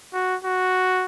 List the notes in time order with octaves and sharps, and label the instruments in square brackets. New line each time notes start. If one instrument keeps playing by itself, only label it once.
[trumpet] F#4
F#4